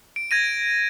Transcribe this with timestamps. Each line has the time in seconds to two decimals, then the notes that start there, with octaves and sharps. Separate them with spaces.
0.16 D7
0.31 G#6 A#6 D#7